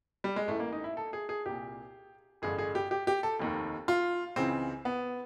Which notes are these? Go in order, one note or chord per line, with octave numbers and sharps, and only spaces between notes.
G3
G#3
A1 A2 E3 A3
A#3
D#4
E4
A4
G#4
G#4
C2 A#2 G4
A1 G2 D3 G#4
G#4
G4
G4
G4
A4
F1 D#2 D#3
F4
C#2 C#3 E3 C4
B3